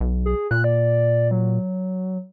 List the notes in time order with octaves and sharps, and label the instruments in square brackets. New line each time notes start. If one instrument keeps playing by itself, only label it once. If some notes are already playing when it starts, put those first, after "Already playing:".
[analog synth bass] B1
[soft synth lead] G#4
[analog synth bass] A#2 [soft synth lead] F#6
[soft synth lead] D5
F#3